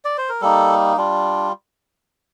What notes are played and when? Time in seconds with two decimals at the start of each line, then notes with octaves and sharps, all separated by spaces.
0.05 D5
0.18 C5
0.29 A#4
0.42 G3 A#3 D#4 A4
0.97 G3 D4 F4